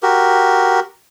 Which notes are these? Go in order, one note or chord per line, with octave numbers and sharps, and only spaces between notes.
F#4 G4 A#4